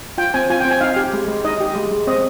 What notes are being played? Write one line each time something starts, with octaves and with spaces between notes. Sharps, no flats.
F4 G5
C4 G#5
F4 G#5
G5
C4
G#5
D#4 F5
G4
G#3
G#3
D#4 D#5
G4
G#3
G#3
C4 D#5